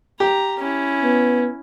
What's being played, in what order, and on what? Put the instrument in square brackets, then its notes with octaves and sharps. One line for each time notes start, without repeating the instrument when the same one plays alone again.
[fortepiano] G4 [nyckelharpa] A#5
[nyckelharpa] C#4 E4
[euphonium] B3